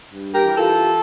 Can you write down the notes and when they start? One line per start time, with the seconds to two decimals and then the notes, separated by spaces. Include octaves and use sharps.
0.09 G2
0.33 G4 A#4
0.45 E3
0.57 F4 A4